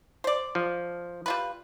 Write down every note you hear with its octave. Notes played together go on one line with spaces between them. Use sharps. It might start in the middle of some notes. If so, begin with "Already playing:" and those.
C5 D5
F3
G3 F4 B4